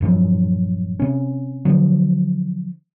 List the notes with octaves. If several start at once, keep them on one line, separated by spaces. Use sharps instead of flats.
D#1 G2 F3 F#3
C3 C#4
D3 F3 F#3